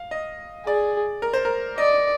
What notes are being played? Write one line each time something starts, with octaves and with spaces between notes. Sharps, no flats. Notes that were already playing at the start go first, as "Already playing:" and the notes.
Already playing: F5
D#5
G#4 D5
A#4
C5
A#4
D5 D#5